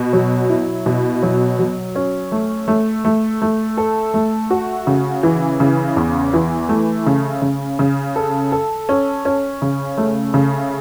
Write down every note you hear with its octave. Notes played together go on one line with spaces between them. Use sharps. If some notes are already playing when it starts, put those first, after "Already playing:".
Already playing: B2
F#3
E4
B2
F#3
F#3
C#4
A3
A3
A3
A3
A4
A3
F#4
C#3
E3
C#3
E2
E3
A3
C#3
C#3
C#3
A4
A4
C#4
C#4
C#3
A3
C#3